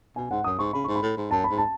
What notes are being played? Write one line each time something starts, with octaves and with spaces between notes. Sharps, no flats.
B2 G#5
G#2 F#5
F#2 D#6
G#2 C#6
C#3 B5
G#2 C#6
B5
A2
G#2
F#2 A5
B5
G#2
A5